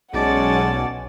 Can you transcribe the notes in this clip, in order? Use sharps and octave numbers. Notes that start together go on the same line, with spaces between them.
B1 G#3 C#4 D5 F#5 A5